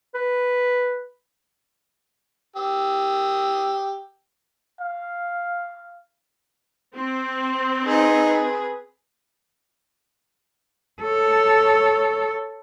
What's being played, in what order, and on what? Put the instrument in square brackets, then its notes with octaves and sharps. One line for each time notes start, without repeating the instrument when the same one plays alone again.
[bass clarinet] B4
[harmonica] G4 D#6 E6
[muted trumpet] F5
[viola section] C4
[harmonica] D#4 [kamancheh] G#4 B4
[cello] A4 C#5